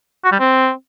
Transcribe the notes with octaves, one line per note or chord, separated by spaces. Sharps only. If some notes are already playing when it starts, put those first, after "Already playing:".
F#4
G3
C4